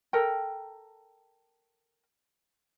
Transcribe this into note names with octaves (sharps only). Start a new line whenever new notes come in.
A4 A#4 G5